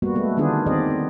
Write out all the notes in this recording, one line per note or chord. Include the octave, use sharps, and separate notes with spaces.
G3 A#3 B3 F#4
G#3 A3 B3
D3 D#3 B3 D4 F4 G#4
D#3 C4 G#4 D5 D#5
B3